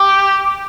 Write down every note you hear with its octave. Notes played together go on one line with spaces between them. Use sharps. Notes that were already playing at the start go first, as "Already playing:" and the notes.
Already playing: G4